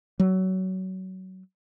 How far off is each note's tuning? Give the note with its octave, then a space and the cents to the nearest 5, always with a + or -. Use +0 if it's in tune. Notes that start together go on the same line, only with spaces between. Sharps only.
F#3 +20